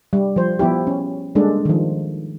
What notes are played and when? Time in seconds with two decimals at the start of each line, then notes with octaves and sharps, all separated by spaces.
0.13 G3
0.36 F3 C5
0.59 F3 B3 E4 G4
0.87 C#4
1.35 G3 G#3 A#3 D4 A4
1.65 D#3 F3